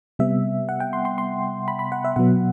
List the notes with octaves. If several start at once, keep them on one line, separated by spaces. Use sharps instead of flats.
C3 G3 B3 E5
F#5
G5
C6
C6
C6
B5
B5
F#5
E5
B2 F#3 B3 F#5